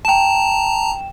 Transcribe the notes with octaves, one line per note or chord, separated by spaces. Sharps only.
G5 A5 A#5 E7